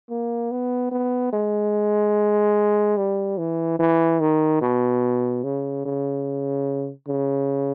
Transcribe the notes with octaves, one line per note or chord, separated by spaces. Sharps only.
A#3
B3
B3
G#3
G3
E3
E3
D#3
B2
C#3
C#3
C#3